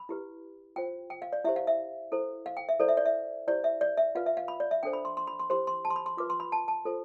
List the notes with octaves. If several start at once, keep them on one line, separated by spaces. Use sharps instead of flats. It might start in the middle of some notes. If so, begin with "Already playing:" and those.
Already playing: B5
E4 G4 B4
F4 C5 G5
G5
F5
D5
E4 G4 C5 E5
F5
E5
E4 A4 C5
F5
G5
E5
E4 A4 C5 D5
E5
D5
E5
E4 G4 C5 D5
E5
D5
E5
F4 B4 F5
E5
F5
B5
D5
E5
D4 A4 C5 G5
B5
C6
C6
B5
C6
E4 G4 C5 C6
C6
A5
C6
B5
C6
F4 B4 D6
C6
B5
A5
A5
F4 A4 C5